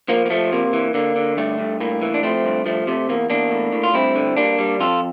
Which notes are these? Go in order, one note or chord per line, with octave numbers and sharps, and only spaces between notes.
F3 A#3
A#3
F3 A3
C3 A#3
E3
D3 A#3
D3
G2 A3
G2
A2 A#3
E3
D4
F3 A3 C4
G2
F3 A3
C3 A3
E2 A#3
E2 A#3 D4
A2
A2
F4
G2 C4 E4
D3
G3 A#3 D4
G3
F2 F4 A4